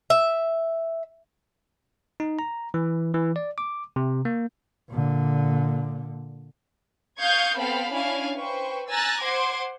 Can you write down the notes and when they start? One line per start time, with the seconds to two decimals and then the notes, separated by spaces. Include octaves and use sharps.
0.10 E5
2.20 D#4
2.39 A#5
2.74 E3
3.14 E3
3.36 D5
3.58 D6
3.96 C3
4.25 A#3
4.90 A#2 D3
7.19 F5 C#6 D#6 G6 G#6
7.57 B3 C4 A4 F5 G5 B5
7.92 C#4 D4 E4 F5 G#5
8.36 B4 C5 G5 C#6
8.90 G#5 A#5 E6 F#6 A6 A#6
9.21 C5 F#5 C6 D6 G#6